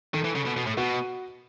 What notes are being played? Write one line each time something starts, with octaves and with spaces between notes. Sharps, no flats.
D#3 A4
E3
C#3
B2
B2
A2
B2 F#4